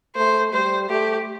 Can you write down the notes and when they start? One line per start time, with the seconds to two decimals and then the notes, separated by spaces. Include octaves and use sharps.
0.16 A3 C5
0.53 G3 C5
0.89 A3 G4